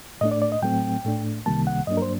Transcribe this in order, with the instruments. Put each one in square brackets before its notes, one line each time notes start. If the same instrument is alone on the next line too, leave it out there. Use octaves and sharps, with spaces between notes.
[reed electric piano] A2 A3 D4 D#5
D5
D5
D#5
A2 F#3 A3 C4 G5
A2 A3 D4
C2 C3 D#3 G3 A#3 A5
F#5
G2 F#3 A#3 D4 D#5
A#4
C5